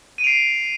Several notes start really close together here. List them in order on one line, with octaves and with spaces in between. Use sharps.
D#7 D7 F7 C7